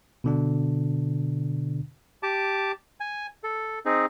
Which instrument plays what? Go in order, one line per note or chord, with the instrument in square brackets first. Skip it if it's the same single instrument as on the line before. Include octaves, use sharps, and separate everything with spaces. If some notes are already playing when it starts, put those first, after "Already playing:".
[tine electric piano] B2 D3 D4
[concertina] G4 A5 D6
G#5
A4
C4 D#4 G#4